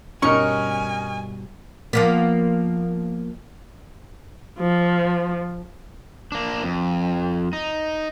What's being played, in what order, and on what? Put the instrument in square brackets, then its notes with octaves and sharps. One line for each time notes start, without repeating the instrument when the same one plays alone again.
[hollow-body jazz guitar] G2 B2 G3 [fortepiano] C#4 D#4 A#4 [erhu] G#5 [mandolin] C#6
[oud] F3 A#3 B3
[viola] F3
[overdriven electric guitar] A#3 D4
F2
D#4